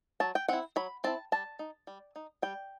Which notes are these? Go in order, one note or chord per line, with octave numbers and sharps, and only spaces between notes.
F#3 A5
G5
C4 E4 F#5
F#3 B5
C4 E4 A5
G3 A5
D#4
G3
D#4
G3 G5